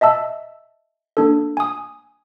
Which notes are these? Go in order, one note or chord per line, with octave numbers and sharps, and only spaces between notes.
D#5 E5 A5 E6
A#3 D4 A4
G#5 D#6